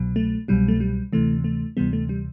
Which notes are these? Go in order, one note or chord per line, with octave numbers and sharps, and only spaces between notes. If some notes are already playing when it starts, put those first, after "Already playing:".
Already playing: C2 B2 F#3
A3
C2 B2 F#3 G3
A3
G3
D2 C3 E3 A3
A3
D2 C3 E3 G3 B3
A3
G3